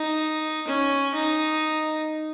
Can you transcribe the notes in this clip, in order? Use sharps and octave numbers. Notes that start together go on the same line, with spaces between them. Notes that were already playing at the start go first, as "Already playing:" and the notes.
Already playing: D#4
C#4
D#4